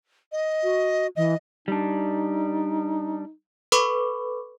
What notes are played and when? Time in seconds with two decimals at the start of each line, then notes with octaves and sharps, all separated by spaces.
0.32 D#5
0.63 F#4
1.16 E3 D#5
1.68 G3 D4 D#4
3.72 A4 B4 B5 C#6 D6